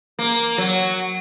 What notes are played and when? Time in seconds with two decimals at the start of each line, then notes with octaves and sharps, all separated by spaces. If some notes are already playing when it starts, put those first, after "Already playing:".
0.19 A#3
0.58 F#3